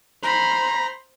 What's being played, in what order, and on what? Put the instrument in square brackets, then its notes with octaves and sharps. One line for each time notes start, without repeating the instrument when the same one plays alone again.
[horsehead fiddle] C5 B5 [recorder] A#5